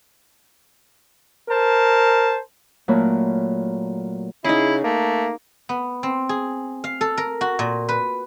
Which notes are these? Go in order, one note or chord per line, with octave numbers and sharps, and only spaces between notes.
A#4 C5 A5
A#2 F#3 A3 A#3 C#5 B5
C#3 D#4 E4 G#4
A3 A#3
B3
C4
G#4
F5
A4
A#4
F#4
A#2
B4